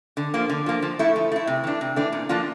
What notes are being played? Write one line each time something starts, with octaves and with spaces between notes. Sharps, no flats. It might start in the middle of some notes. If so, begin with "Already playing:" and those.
D3
F3 A#3
D3
F3 A#3
F3
A3 E4
F3
A3 E4
C3
E3 A3 D4
C3
E3 A3 D4
A#2
F3 A#3 D4 F4